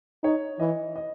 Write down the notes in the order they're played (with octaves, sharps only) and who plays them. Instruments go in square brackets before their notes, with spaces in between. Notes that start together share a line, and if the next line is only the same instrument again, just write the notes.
[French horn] D#4 [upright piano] C#5
[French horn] E3 [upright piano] D#5
[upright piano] D#5